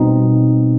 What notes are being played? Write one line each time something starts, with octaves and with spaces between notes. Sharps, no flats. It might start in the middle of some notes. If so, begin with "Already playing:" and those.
Already playing: B2 G3 C4 D#4